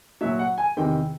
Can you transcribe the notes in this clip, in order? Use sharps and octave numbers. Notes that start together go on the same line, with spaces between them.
A#2 F#3 E5
F#5
G#5
E2 C3 D#3 G5